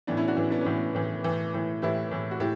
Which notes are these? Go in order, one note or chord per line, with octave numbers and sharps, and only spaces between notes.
A2 E3 B3 D4
C#4 E4
D4 F#4
A2 E3
B3 D4
C#4
A2 E3 B3
A2 E3
A2 E3
A2 E3
A2 E3 E4 G4
A2 E3
F#4
A2 E4 G4